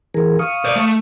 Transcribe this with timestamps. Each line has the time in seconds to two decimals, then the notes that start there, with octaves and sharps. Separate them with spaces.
0.14 E3 G#4 A#4
0.39 F5 C#6 D#6
0.65 C5 D5
0.76 A3